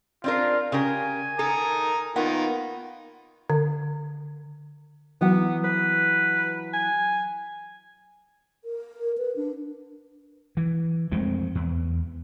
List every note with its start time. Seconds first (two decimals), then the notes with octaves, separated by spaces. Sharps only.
0.24 C4 D4 F4 A#4
0.72 C#3 G4 A#4 G#5
1.39 A4 A#4 A#5 D#6
2.16 D#3 A#3 B3 F4 F#5
3.50 D3
5.21 E3 F#3 B3 F#5
5.64 B4
6.74 G#5
8.65 A#4
9.18 B4
9.36 D4
10.57 E3
11.12 F2 G#3 A3 C4
11.55 E2